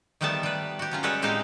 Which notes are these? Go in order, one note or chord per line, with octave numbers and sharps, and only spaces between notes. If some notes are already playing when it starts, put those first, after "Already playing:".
D#3 F3 G3 A3 B3 A5
G3 B4
F#4 G4
F#3 C#4 F4
G3 G#3 F#4 A4 B4 C#5
A2 G#3 C4 D#4 G4 F5